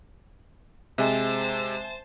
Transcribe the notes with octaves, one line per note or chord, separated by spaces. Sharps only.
C3 G#3 C5 E5 G#5 A5